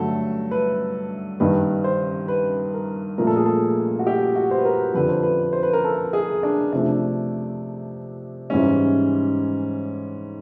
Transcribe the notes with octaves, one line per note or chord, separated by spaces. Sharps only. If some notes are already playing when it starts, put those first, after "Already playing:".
Already playing: G2 D3 F#3 A3 A4
B4
G2 D#3 G3 B4
C5
B4
A#4
A#2 F3 A3 A#4
A4
G#4
A4
F#4
G4
F#4
C5
B4
A#4
F2 D3 F3 B4
C5
B4
C5
B4
A#4
A4
G#4
D4
C3 F3 A3 D4
G#2 E3 G3 C#4